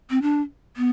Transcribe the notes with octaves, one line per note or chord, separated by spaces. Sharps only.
C4
D4
B3